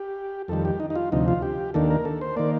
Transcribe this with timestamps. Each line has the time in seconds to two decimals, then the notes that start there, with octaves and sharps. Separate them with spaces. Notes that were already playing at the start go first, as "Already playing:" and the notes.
Already playing: G4
0.48 F2 D#3 G3 A4
0.65 G4
0.80 D#4
0.90 D#4
0.95 F4
1.12 D2 C3 F3 D#4
1.28 F4
1.42 G4
1.74 D#2 D#3 A#3 D4 A4
1.90 A#4
2.05 A4
2.21 C5
2.36 D#3 A#3 D5